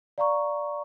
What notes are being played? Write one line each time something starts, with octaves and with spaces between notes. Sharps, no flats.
D5 F5 A#5 C#6